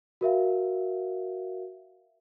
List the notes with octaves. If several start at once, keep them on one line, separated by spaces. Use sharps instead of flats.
F#4 A#4 E5 F5